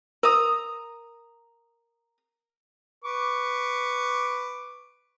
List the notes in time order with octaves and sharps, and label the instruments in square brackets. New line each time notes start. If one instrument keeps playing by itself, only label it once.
[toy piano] A#4 [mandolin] A#5 D#6
[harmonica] B4 C#6 D6